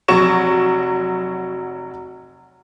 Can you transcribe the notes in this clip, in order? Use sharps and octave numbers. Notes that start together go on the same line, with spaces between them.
F1 F#3 C#6 E7